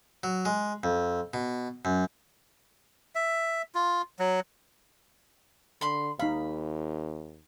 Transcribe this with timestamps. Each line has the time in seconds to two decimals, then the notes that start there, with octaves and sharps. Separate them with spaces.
0.23 F#3
0.45 G#3
0.83 F2
1.34 B2
1.85 F#2
3.15 E5
3.75 F4
4.19 F#3
5.81 D3 B5 C6
6.19 D#2 D#4 F5 B5